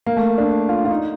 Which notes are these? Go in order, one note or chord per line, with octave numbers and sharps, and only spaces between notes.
A#3
A3
D4
F4
F4
D#4